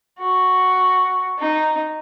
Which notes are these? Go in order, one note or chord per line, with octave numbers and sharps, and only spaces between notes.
F#4
D#4